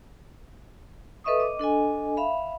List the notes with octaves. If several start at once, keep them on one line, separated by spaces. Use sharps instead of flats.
A4 B4 D#5 E5 C#6 D#6
D#5 D6
D4 A4 D#5 G#5
E5 F5 B5